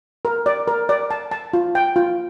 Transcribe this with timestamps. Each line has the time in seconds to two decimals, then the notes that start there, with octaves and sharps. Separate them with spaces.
0.25 A#4
0.46 D5
0.68 A#4
0.89 D5
1.11 A5
1.31 A5
1.53 F4
1.75 G5
1.96 F4